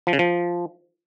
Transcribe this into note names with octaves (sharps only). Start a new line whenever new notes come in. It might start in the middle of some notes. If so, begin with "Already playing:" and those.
F3
C#3
F3